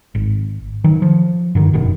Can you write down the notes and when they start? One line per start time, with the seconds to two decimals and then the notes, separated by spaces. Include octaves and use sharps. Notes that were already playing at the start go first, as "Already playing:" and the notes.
0.15 G#1
0.84 D#3 F#3
1.02 F3
1.55 G2 D3 D#3
1.73 F1 G2 B2 D#3